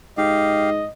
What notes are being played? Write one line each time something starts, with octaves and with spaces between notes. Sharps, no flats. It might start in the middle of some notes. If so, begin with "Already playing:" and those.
G#2 G4 D#5 F5